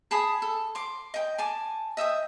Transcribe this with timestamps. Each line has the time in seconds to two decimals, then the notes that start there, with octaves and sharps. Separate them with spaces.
0.11 G#4 A5 B5 D#6
0.42 A4
0.75 C6 D6
1.14 D#5 G5
1.38 G#5 A5 D6
1.97 D#5 E5 G5 D#6